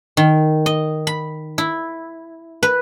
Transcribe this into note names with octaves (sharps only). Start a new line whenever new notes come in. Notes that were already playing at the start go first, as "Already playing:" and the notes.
D#3
D#5
B5
E4
B4